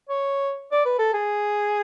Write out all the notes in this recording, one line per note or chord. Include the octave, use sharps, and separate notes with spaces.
C#5
D5
B4
A4
G#4